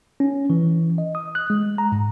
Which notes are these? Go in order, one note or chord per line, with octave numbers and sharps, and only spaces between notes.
C#4
E3
D#5
D#6
F#6
G#3
A#5
G#2